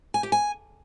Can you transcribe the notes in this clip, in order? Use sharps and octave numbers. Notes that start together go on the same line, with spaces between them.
G#5
G4
G#5